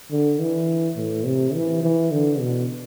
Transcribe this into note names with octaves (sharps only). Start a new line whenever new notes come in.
D3
E3
A2
C3
E3
E3
D3
B2